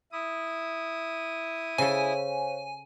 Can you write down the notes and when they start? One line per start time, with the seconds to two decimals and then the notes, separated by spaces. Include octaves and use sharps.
0.12 E4 D#6
1.78 C#3 A4 C5 C#5 F5 G#5